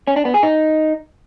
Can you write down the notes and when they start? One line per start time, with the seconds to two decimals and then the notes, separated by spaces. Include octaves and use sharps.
0.07 C#4
0.16 D4
0.25 B3
0.34 G#4
0.43 D#4